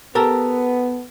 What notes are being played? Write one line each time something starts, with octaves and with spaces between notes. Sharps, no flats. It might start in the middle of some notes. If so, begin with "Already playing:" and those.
B3 G4 A4 A#4